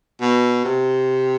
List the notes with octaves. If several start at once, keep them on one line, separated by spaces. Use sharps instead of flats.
B2
C3